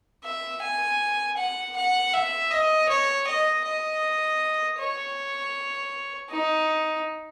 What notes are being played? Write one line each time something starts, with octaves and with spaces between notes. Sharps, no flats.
E5
G#5
F#5
F#5
E5
D#5
C#5
D#5
D#5
C#5
D#4